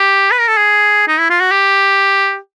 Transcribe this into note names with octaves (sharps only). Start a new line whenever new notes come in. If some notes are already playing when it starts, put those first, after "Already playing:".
Already playing: G4
B4
A#4
A4
G#4
D#4
E4
F4
F#4
G4